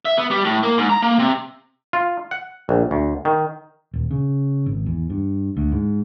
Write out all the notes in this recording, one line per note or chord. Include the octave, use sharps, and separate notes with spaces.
E5
B3
G3
A2
A#3
G#2
A#5
A#3
C3
F4
F#5
A#1
D2
D#3
D#1
C#3
G#1
E2
G2
D2
G#2